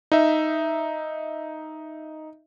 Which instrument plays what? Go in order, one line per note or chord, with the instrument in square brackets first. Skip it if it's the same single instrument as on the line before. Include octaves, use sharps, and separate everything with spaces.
[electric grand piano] D#4 E5